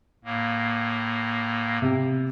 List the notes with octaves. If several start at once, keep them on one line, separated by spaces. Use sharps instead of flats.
A2 A#3
C3